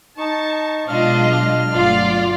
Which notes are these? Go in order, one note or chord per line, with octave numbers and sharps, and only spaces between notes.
D#4 A5 C#6
B2 F#3 G#3 D4 F4 D#5 F6
G1 F#3 A3 F4 D5 F5